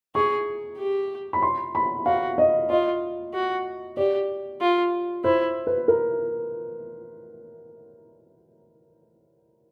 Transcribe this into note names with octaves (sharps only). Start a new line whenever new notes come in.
G#4 C#6
G4
B5
C6
B5
F#4 F5
D#5
F4 D#5
F#4
G4 D5
F4
E4 C5
B4
A#4